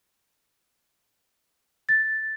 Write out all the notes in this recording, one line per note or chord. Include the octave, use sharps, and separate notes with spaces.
A6